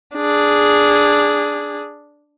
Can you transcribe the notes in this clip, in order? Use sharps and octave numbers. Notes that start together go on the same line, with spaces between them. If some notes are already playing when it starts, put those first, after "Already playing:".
D4 G#4